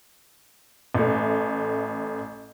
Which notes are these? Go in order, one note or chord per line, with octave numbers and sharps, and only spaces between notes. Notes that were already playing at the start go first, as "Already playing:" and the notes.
A1 A3